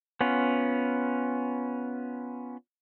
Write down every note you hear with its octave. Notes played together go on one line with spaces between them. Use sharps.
B3 C#4 F4